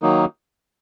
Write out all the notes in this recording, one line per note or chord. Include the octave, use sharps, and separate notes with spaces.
D#3 F#3 A#3 D#4